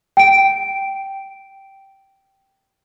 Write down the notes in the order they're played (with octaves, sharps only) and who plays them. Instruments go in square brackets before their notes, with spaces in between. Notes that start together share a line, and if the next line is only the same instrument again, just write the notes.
[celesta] G5 D7